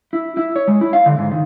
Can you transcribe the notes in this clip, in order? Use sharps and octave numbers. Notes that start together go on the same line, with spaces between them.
E4
E4
C#5
G#3
E4
F5
D3
G#2
D#3